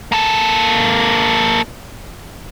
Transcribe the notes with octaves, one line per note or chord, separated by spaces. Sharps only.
A#3 A4